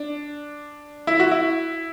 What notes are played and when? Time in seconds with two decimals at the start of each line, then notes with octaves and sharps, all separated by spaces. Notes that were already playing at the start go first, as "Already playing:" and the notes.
Already playing: D4
1.07 E4
1.20 F#4
1.32 E4